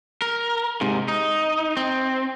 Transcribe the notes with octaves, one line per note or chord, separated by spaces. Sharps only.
A#4
G#2 C3
D#4
C4